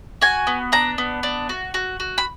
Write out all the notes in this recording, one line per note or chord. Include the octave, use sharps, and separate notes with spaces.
F#4 G#5
B3
D4 A#5
B3
D4
F#4
F#4
F#4
B5